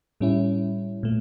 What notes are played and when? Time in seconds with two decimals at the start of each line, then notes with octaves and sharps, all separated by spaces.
0.21 A2 G3 C#4 E4
1.03 A#2 A3